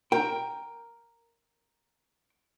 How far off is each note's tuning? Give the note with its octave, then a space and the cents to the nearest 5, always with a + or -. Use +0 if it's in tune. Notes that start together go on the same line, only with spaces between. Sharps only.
A#4 +0 G5 +10